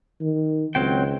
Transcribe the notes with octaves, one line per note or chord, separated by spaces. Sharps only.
D#3
C#2 F#3 C4 G5